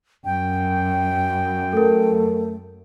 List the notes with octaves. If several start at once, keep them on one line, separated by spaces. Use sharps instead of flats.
F#2 G5
A3 A4 A#4